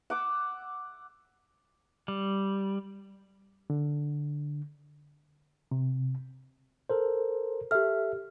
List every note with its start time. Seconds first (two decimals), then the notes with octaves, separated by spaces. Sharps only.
0.10 F#5 D6 E6
2.08 G3
3.70 D3
5.71 C3
6.90 A4 A#4 C5
7.71 G4 A4 E5 F6